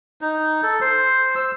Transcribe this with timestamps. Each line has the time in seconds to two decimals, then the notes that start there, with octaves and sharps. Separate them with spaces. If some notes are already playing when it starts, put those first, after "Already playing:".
0.21 D#4
0.63 A4
0.81 C5
1.36 E6